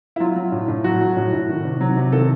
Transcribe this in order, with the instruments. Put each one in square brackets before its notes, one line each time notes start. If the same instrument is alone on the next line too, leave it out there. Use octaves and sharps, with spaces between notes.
[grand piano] E4
F#3 F4
F#3
A2
A2
F#3 F#4
F#3
A2
A2
D#3
C3
F#3
C3
D#3 A4